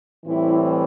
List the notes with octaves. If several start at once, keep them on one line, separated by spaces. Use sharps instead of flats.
A2 E3 G3 C4 E4